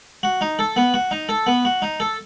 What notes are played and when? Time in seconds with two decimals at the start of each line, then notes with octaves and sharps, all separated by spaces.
0.23 F#4
0.41 D#4
0.59 A4
0.76 B3
0.94 F#4
1.11 D#4
1.29 A4
1.47 B3
1.65 F#4
1.82 D#4
2.00 A4